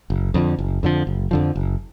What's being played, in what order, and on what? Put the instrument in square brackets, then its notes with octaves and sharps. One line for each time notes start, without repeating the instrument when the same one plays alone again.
[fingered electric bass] F#1
F2 D3 F3
F#1
F2 D3 F3
F#1
F2 D3 F3
F#1